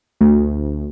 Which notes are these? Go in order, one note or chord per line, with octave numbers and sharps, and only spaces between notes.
D2